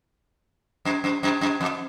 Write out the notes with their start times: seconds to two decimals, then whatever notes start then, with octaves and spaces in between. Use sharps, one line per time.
0.85 F#2
1.04 F#2
1.23 F#2
1.41 F#2
1.61 F2